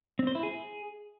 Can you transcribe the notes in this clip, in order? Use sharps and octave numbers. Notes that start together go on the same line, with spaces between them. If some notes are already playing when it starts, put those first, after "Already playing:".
C4
C5
E4
G#4